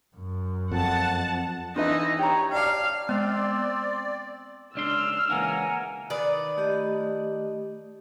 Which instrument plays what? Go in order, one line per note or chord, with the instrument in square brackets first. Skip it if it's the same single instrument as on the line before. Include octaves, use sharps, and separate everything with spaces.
[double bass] F#2
[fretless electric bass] F2 [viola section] F#5 A5
[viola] E3 D#4 [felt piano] D4 [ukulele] F4 B4 D#5
[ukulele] G4 A#5 [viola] C#5
[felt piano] D5 A5 D6 [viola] F5
[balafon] G#3 B3 [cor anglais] C4 [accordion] D5
[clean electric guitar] C#2 D4 C6 [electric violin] E6 F6
[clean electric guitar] C#2 E3 A#3 [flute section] F#5 G#5 A#5
[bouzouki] D#3 B4 D5
[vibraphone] A3 G4 D#5